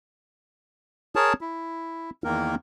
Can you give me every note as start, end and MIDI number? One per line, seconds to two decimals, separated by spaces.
1.16 1.33 68
1.16 1.33 70
1.16 1.33 73
1.16 1.33 81
1.41 2.10 64
2.24 2.55 40
2.24 2.55 51
2.24 2.55 58
2.24 2.55 70